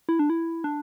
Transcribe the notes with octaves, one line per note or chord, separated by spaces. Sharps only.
E4
D4
E4
D4